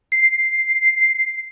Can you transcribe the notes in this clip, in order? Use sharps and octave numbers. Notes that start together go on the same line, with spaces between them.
C7